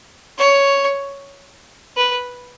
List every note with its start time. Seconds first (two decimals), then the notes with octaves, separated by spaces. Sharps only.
0.38 C#5
1.97 B4